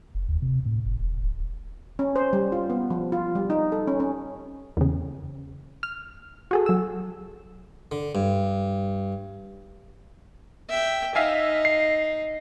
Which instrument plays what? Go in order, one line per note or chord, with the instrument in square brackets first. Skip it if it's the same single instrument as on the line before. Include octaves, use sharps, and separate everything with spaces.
[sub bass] F1
D#2
C3
A2
F#1
D#1
D1
[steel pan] C#4
C5
G3
F4
B3
F3
F4
G3
D#4
A4
C#4
C#4
[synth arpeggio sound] E2 C#3
F6
F#4 G#4 A4
F#3 E6
[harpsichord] D3
G2
[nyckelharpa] E5 G5
[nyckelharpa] D#4 [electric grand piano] E5 F5 G#5
[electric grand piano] C7